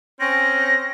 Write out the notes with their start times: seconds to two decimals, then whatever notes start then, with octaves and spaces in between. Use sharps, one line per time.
0.20 C4 C#4 A#6